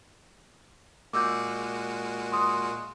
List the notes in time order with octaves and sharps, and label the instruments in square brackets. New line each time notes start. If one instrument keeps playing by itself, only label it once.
[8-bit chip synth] A#2 G#3 F#4 [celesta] D6 E6 G6
[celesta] C6 D#6